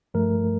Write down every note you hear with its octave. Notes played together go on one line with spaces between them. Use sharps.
G2 F3 A3 A#4